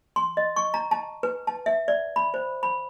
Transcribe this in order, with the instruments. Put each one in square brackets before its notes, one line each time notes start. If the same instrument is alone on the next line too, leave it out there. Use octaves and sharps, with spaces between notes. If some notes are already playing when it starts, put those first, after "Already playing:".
[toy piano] C6
D#5
C#6
A#5
A5
B4
A5
E5
D5
B5
C5
B5